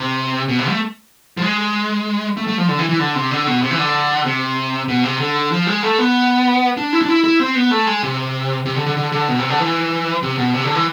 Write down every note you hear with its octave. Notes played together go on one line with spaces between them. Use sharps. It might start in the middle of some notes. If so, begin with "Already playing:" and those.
Already playing: C3
B2
C3
A3
F3
G#3
A3
A3
F3
D3
E3
E3
D3
C3
D3
B2
C3
E3
D3
C3
B2
C3
D3
F3
G#3
A3
B3
D4
E4
D4
E4
E4
C4
B3
A3
G#3
C3
C3
D3
D3
D3
D3
B2
C3
D3
E3
C3
B2
C3
D3
E3